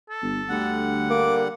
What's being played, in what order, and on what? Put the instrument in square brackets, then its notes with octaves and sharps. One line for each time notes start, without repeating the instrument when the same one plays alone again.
[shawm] A4
[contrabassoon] G1
[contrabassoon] D2 [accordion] D3 G3 F#5
[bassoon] A#3 [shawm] D6